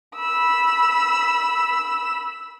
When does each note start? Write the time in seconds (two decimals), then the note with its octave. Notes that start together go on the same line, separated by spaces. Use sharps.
0.16 B5 E6